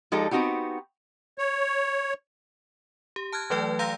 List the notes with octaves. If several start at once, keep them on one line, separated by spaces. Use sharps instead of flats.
F3 G#3 D#4 G4 A4
B3 C4 D#4 F#4 G4
C#5
G4
A5 F6 F#6 G#6
E3 F#3 A3 B4 D5 G5
F5 A#5 C6 E6 G6 A#6